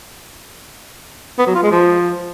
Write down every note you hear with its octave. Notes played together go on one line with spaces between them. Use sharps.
B3
F#3
F4
G#3
F3